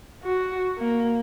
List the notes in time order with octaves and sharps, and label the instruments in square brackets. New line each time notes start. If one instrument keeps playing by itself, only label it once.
[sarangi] F#4
A#3